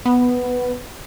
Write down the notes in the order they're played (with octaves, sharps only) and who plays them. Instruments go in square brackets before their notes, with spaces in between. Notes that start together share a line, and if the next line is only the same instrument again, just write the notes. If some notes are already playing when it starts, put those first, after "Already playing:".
[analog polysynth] B3